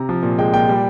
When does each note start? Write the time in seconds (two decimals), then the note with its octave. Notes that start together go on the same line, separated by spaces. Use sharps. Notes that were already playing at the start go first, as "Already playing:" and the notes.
Already playing: C3 A#5
0.09 F3
0.23 A#2
0.38 G#3 G5
0.53 A#2 G5
0.69 G3